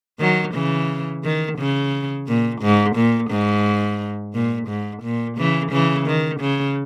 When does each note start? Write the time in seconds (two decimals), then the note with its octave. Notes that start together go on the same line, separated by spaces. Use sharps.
0.20 D#3 F#3
0.54 C#3 E3
1.24 D#3
1.59 C#3
2.27 A#2
2.62 G#2
2.96 A#2
3.30 G#2
4.34 A#2
4.68 G#2
5.03 A#2
5.37 C#3 E3
5.72 C#3 E3
6.07 D#3
6.41 C#3